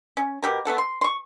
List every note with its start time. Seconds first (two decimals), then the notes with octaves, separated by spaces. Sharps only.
0.17 C#4
0.42 B2 G3 G4 A#4
0.65 A3 B3 A4 F#5
0.78 C6
1.01 C6 C#6